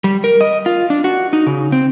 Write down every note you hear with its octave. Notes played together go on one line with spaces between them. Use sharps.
G3
A#4
D#5
F4
D4
F#4
D#4
C#3
C4